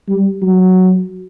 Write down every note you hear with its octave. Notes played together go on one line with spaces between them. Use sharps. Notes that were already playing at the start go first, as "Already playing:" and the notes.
G3
F#3